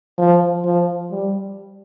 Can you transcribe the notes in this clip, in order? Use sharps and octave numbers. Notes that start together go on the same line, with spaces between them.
F3
F3
G3